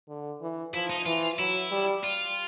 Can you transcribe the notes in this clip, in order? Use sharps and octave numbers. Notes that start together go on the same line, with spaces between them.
D3
E3
F3 E4
D#4
E3 F4
F#3 E4
G3
F4